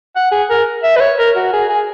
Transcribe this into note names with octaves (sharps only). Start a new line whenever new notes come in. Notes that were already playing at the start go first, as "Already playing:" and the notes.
F#5
G#4
A#4
E5
B4
C#5
A#4
F#4
G#4
G#4